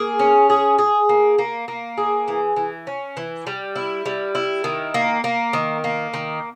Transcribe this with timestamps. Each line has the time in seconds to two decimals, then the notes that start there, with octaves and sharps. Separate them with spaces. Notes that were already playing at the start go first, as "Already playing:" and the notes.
Already playing: A#3 G#4
0.19 C#4
0.50 G#4
0.79 G#4
1.09 A#3
1.38 A#3
1.68 A#3
1.98 G#4
2.28 E3
2.56 E3
2.87 C#4
3.17 E3
3.47 G3
3.76 E4
4.06 G3
4.35 E4
4.64 D#3
4.94 A#3
5.24 A#3
5.53 D#3
5.84 A#3
6.14 D#3